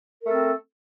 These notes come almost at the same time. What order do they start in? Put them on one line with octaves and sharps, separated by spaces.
A#4 A3 A4 C4